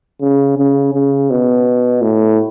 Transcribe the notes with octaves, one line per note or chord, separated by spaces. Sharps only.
C#3
C#3
C#3
B2
A2